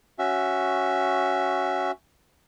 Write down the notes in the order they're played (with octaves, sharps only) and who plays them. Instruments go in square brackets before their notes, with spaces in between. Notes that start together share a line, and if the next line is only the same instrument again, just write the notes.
[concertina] C#4 F#4 E5